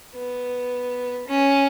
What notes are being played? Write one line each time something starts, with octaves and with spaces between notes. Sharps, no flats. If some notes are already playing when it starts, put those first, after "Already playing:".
B3
C#4